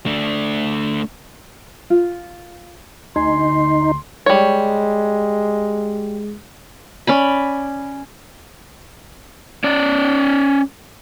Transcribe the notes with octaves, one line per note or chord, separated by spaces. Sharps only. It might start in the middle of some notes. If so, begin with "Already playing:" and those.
A3 D4
F4
D2 D#4 G#4 C6
G3 G#3 C#5
C#4 D5 B5
C#4 D5